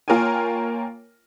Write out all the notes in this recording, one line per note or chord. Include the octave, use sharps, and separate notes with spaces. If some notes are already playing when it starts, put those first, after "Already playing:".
A#3 F4 A#4 C#5 G5 G#5